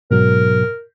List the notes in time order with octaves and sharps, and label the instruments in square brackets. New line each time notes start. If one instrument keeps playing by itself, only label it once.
[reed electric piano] G#2 B2 F#3 [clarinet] A#4